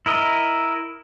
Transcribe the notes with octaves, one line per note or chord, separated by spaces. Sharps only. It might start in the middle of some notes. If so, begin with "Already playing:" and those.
E4 A#4 D#5